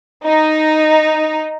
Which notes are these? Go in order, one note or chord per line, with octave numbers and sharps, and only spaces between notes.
D#4